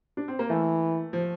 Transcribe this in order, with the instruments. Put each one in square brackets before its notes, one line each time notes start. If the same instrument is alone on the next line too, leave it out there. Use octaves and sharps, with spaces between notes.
[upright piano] D4
C4
A#3
[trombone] E3 [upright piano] A3
[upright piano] F3